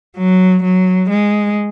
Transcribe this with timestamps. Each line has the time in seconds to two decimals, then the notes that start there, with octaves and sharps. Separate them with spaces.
0.16 F#3
0.63 F#3
1.10 G#3